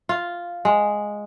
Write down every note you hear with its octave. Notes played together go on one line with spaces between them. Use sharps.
F4
G#3